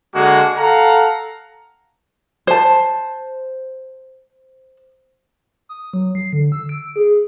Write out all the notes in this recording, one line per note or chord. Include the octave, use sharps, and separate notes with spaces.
D3 G#3 A#3 F#4
A4 F5 F#5 A#5
C5 A5
D#6
F#3
C7
D3
E6
D7
G#4